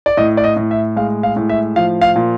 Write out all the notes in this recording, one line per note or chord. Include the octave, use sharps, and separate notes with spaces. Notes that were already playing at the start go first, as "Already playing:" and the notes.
D5
A2 D#5
D5
D#5
A2
E5
G#3 F5
F5
A2
E5
F3 F5
F5
A#2